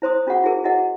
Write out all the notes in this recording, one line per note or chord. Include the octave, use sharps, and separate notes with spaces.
E4 C5 C6 D#6
C#4 F4 F#4 G#4 F#5 C#6
E4 F#4 G#4 A#4
E4 F#4 G#4 A#4 D#5 F#5